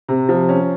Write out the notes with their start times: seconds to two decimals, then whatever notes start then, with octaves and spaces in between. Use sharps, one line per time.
0.09 C3
0.29 F3
0.49 C#4